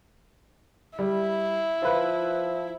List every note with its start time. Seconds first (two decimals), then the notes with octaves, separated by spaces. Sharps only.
0.99 G3 E4
1.82 F3 F4 B4